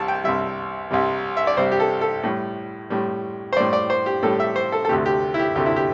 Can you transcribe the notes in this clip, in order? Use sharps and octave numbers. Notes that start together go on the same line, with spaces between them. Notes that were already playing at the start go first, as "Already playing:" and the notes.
Already playing: C2 C3 G3 A5
G5
C2 C3 G3 E5
C2 C3 G3
E5
D5
C2 C3 G3 C5
G4
A4
A4
A2 G3
A2 G3
C5
A2 G3 D5
D5
C5
G4
A2 G3 A4
E5
C5
A4
A4
D2 C3 A3 G4
G4
E4
G4
D2 C3 A3 G4
E4
G4